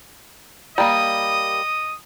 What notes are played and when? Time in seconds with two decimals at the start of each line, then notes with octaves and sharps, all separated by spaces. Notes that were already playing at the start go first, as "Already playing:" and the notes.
0.78 G3 A#3 D#5 D#6